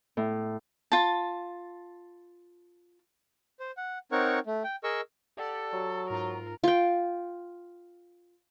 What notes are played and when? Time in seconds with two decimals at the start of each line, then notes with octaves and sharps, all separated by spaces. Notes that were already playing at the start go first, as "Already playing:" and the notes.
0.17 A2
0.92 F4 A5
3.60 C5
3.77 F#5
4.12 C4 D#4 A#4 C#5 F#5 C#6
4.47 A3
4.64 G5
4.84 G#4 A#4 D#5 C#6 E6
5.37 G4 A4 D5 F#5
5.73 F#3
6.10 G#2 F4 A#4
6.64 F4 G5